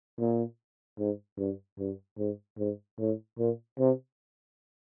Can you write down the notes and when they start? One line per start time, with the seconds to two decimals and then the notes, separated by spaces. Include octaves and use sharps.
0.19 A#2
0.99 G#2
1.39 G2
1.79 G2
2.18 G#2
2.58 G#2
2.99 A2
3.38 A#2
3.79 C3